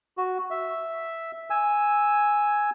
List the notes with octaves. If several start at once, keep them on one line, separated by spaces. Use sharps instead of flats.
F#4
E5
G#5 E6